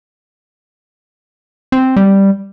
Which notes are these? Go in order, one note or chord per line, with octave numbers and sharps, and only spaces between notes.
C4
G3